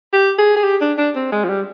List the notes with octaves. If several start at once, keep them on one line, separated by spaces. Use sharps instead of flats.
G4
G#4
G#4
G4
D4
D4
C4
G#3
F3
G3